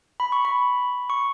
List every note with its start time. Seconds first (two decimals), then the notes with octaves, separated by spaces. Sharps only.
0.20 B5
0.32 C#6
0.45 B5
1.10 C#6